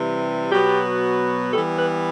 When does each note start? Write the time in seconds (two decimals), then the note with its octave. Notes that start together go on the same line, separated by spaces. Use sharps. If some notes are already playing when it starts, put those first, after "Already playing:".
Already playing: C3 E3 G3
0.52 B2 F#3 B3 G4
1.52 E3 G3 B3 A4
1.77 B4